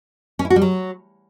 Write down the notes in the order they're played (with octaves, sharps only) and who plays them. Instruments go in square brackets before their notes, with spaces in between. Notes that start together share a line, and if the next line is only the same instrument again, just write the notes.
[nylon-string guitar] C#4
E4
F#4
G3
F#3